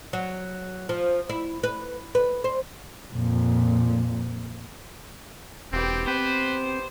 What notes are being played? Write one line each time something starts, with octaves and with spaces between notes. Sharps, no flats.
F#3
F3
E4
B4
B4
C5
F2 A#2
E1 B3 C4 G4
C4 B4 C5